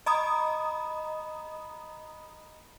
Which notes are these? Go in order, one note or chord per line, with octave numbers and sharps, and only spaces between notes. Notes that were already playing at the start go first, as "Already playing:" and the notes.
D#5 A#5 B5 D#6